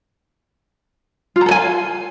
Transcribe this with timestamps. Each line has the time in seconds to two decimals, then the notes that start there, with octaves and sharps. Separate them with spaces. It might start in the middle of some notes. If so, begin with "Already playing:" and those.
1.36 F4
1.41 A#5
1.46 A4
1.51 G#5
1.56 F5